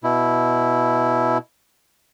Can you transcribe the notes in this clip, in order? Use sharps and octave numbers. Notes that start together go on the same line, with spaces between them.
B2 E4